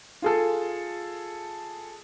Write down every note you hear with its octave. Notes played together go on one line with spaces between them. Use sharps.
F4 G#4 A4